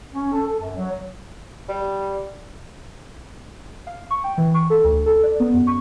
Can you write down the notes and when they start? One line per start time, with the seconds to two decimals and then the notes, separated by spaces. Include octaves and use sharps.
0.13 C#4
0.32 A4
0.47 A4
0.60 F#2
0.75 F#3
1.69 G3
3.87 F5
4.11 C#6
4.24 G5
4.38 E3
4.54 C#6
4.70 A4
4.84 D2
5.06 A4
5.23 D5
5.40 B3
5.53 F#2
5.67 C#6